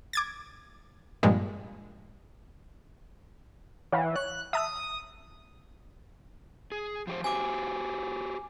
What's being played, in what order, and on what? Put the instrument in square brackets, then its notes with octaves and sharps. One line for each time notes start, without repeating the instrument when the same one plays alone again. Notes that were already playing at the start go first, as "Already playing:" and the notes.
[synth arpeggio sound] D6 G#6 A6
G2 A#2 F3 G3 G#3
[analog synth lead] E3 [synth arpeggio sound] C#5 F5 F#5
[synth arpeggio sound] C#5 [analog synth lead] F#6
[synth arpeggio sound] E5 A5 E6 [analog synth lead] D#6
[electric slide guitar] G#4
F3 G4 C5
[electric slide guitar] F#4 G4 C5 [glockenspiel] G#5 D6